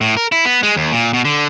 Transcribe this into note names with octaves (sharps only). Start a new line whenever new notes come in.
A2
A#4
E4
B3
G#3
D#2
A#2
B2
D3